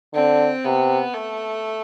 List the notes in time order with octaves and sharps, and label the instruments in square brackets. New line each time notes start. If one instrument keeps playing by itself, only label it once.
[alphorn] D3 [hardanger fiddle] C4
[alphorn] C3 [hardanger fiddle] B3
[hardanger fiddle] A3